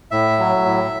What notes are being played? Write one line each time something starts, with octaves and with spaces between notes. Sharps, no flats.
A2 E5
F#3
A2